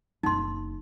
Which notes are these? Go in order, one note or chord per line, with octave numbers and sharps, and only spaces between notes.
F#1 D4 D#4 C6